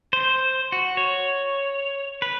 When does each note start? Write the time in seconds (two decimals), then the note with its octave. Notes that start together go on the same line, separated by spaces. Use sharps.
0.13 C5
0.72 F#4
0.97 C#5
2.22 B4